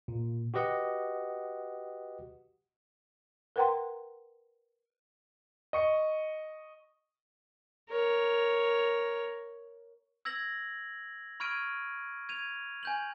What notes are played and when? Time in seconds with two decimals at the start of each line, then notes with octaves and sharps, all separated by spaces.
0.08 A#2
0.54 F#4 G4 B4 D#5 F#5
3.56 A#4 B4 F#5 G5 A#5 C6
5.73 D#5 C#6 C#7
7.89 A#4 C#5
10.25 E6 G#6 A#6 F#7
11.40 B5 C#6 F6 G#6 D7 D#7
12.29 G#6 D#7 F7
12.83 G#5 G6 F#7